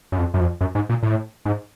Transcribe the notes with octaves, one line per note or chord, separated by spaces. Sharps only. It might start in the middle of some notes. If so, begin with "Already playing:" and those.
F#2
F2
F#2
F2
F#2
G#2
A#2
A2
G#2